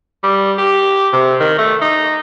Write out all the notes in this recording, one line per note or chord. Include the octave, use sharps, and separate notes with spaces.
G3
G4
C3
D#3
A3
D#4